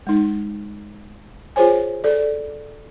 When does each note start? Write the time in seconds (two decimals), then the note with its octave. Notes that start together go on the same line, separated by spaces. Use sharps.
0.07 G#3 D#4
1.56 F4 G#4 C5 C#5 G#5
2.04 A4 D5